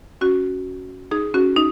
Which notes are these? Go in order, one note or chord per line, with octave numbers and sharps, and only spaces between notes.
C#4 F#4
D#4 G#4
C#4 F#4
D#4